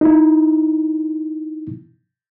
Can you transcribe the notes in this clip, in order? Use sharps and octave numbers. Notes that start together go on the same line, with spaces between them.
D#4 E4